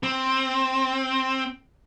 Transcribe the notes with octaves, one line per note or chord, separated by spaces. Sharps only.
C4